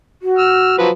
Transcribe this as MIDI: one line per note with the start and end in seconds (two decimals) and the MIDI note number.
0.22 0.77 66
0.38 0.76 88
0.38 0.76 89
0.78 0.89 53
0.78 0.89 54
0.78 0.89 71